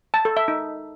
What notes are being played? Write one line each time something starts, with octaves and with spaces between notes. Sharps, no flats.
A5
A4
E5
D#4